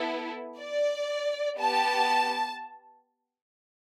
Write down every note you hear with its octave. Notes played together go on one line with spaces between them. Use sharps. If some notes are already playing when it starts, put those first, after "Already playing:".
Already playing: B3 E4 A4
D5
B3 G4 A5